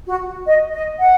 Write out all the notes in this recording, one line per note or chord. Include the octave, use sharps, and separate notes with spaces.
F#4
D#5
D#5
F#5